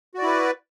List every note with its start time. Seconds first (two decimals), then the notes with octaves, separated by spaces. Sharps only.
0.14 F#4
0.18 D5
0.23 E4
0.27 B4